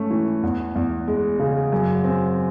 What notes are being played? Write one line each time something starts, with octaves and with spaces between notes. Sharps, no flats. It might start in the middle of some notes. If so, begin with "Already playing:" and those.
Already playing: G#2 A3 C#4
E3
E2
E2
G#3
C#3
F#2
C4